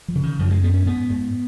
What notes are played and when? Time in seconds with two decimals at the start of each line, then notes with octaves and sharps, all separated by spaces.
0.08 F3
0.15 C#3
0.23 D#3
0.39 F#2 F3
0.51 G#3
0.63 F#2 B3
0.74 C#4
0.85 G#2 B3
1.10 G#2